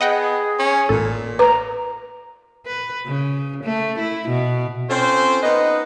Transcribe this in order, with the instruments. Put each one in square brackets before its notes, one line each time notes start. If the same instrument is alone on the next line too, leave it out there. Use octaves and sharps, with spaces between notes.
[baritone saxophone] B3 [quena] G#4 [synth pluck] D#5 F#5 G5
[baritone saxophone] C#4
[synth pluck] A1 A4 [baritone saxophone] A#2
[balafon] B4 [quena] A#5
[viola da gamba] B4
C#3
A3
E4
B2
[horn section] C4 C#4 F4 A4 C5
B3 D#4 B4 D#5